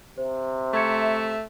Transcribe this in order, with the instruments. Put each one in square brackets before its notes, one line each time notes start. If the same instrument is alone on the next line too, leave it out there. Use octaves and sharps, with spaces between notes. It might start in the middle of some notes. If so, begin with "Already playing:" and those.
[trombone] C3 [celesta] C5
[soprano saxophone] A3 [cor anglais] E5 [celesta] C#6 G#6 C#7